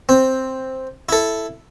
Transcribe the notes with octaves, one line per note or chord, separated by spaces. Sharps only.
C4
E4 A4